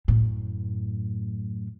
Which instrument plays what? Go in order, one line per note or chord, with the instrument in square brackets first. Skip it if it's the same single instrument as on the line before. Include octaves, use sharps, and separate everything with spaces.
[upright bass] F#2 A2